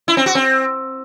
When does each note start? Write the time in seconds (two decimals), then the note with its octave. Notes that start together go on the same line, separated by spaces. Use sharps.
0.08 E4
0.17 C4
0.26 F#4
0.35 C4